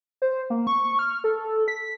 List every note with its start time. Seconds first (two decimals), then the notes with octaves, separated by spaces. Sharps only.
0.22 C5
0.50 A#3
0.67 C#6
0.99 F6
1.24 A4
1.68 B6